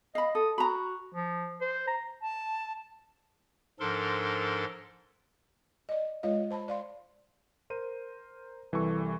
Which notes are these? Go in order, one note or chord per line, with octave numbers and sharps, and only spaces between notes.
D#5 F5 B5
A4 D#6
F#4 A#5 B5
F3
C5
A#5
A5
G#2 F3 D4 A4 A#4 C6
D5 D#5
G#3 F4 C#5 D#5 F5
C5 A5 B5
D5 F5 C6
A#4 C5 D#7
C2 E3 G3 G4 A4 C#6